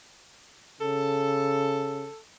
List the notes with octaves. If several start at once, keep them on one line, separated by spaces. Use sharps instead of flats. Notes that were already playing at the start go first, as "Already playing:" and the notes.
C#3 A4